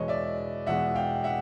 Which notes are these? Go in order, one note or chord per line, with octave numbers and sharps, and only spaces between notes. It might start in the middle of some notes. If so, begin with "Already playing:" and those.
Already playing: E2 B2 G#3 C#5 D#5
D5 E5
E2 B2 G#3 E5 F#5
F5 G5
E5 F#5